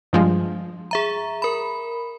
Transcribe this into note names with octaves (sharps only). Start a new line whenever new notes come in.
G2 F3 G#3
G#4 E5 A#5
A#4 B5